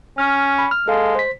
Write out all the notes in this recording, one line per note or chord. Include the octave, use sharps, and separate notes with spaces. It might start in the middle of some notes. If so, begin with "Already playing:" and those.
C#4 F6
B5
F6
G#3 A4 F5 A5
C5 B6